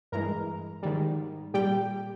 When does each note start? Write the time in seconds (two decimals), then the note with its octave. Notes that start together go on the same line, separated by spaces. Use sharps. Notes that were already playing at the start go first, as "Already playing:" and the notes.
0.12 G2 E3 G#3 A#4 A#5
0.82 G#2 D#3 G3
1.54 A#2 G3 G4 G5